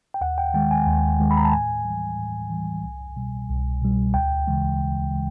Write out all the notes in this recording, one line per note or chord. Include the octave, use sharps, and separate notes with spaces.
G5
D#2 F#5
G5
D#3 G#3 G5
G#5
D#2
D#3 G#3
B5
A#5
A5
A2 G#5
E3 G3
A2
E3 G3
C2
B2 G3
C2
B2 G3
D2 G5
C#3 E3 G#3
D2
C#3 E3 G#3